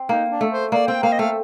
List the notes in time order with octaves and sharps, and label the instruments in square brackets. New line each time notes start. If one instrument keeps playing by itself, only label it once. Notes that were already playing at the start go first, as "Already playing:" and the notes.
Already playing: [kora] C4
[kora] A#3 [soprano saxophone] D#4
[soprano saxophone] D4
[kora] A3
[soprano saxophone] C5
[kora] A#3 [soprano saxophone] D5
[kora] C4 [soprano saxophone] G5
[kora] A#3 [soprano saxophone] F5
[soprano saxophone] D#5
[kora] A3 [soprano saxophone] F5